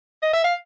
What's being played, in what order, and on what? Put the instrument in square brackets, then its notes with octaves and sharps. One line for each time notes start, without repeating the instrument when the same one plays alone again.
[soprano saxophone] D#5
E5
F5